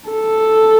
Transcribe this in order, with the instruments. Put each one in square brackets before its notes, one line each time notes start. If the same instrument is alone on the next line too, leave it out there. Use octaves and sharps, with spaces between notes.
[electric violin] A4